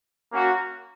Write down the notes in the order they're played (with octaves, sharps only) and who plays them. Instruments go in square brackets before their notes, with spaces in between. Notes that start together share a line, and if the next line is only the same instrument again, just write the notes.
[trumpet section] A#3 C#4 F#4